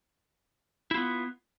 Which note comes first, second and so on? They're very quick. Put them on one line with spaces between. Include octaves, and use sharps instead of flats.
E4 F4 B3